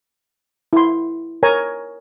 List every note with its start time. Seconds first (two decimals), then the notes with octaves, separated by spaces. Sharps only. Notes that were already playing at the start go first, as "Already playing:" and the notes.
0.73 E4 C6
1.43 A#4 C#5 G#5 A#5